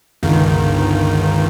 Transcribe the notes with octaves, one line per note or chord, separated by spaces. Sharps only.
G1 C#2 D#3